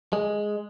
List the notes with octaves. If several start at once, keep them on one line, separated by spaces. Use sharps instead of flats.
G#3